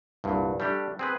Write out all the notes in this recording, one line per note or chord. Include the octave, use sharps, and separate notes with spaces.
C2 G2 A#2
G3 A3 D4 G4
C4 G#4 B4